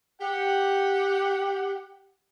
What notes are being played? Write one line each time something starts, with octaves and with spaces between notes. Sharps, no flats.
G4 F#5